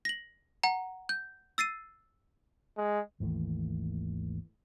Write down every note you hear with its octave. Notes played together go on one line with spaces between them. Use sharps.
A#6 F#7
F#5 A#5
G6
E6 A6 C7 D#7
G#3
G#1 D#2 E3 A3